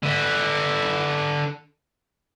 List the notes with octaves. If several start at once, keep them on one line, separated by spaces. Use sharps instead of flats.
D3 B4